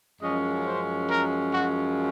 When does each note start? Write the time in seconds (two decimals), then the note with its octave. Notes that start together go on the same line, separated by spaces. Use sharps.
0.21 F#2 F3 G#3 C#4 D#5
0.66 C5
1.10 A#4
1.54 F#4